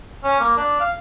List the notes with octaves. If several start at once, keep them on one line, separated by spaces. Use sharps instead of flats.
C#4
A#3
D4
F5